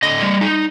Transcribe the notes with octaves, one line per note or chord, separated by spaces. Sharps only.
D3 D#5
G3
D#4